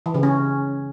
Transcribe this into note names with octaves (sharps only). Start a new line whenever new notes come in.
E3
C#3
C#4